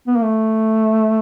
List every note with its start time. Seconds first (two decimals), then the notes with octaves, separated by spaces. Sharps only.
0.07 B3
0.16 A#3
0.24 A3